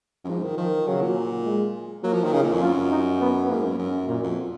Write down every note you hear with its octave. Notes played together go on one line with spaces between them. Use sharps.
F#2
G#2 F3
D#3
D#3 F3
C#3 F#3
A#2
G#3
F#3 A#3
F3
D#3
C#3 D#4
A#2
F2
F#2 F4
D#4
B3
G#2 A#3
F#2
F#2
F#2 A#2
F2